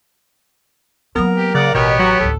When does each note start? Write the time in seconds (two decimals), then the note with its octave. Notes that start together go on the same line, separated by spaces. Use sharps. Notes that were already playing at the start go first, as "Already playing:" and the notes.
1.16 F#3 A#3 B3 A#4
1.37 G4
1.55 C#3 D5 F#5
1.75 A1 B2 B3 G4 C#5
1.99 F#3 F#4
2.20 A1 D2 A4